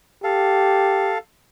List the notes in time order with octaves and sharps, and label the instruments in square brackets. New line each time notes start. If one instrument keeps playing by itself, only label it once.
[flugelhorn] G4 [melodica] A4 F5